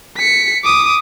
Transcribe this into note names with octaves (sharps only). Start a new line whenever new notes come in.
B6 C#7
D6 D#6